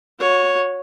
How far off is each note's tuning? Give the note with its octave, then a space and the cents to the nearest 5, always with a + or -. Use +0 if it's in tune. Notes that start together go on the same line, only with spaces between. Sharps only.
F#4 -35 C#5 +0